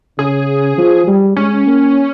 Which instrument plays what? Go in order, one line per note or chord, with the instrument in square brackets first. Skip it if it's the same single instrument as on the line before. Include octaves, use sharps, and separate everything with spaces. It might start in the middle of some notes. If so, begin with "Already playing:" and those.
[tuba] C#3 [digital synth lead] G#4
[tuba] F3
G3
[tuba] G#3 [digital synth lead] C#4
[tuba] A#3